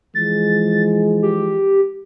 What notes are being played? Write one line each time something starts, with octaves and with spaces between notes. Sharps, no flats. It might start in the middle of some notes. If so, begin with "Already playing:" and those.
E3 F3 G#3 A6
G4